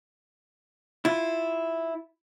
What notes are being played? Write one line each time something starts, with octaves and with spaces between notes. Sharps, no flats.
E4 F4